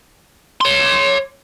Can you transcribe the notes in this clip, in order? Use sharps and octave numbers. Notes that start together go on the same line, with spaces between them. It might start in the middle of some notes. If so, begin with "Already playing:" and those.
C#5 C6